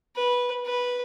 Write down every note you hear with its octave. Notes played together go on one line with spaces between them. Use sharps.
B4
B4